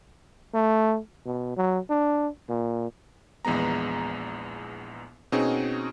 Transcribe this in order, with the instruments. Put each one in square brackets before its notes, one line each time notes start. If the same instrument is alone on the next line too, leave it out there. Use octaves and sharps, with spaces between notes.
[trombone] A3
B2
F#3
D4
A#2
[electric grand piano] A#1 E2 G#3 B3 A#5
B2 C4 C#4 D#4 F#4 G#4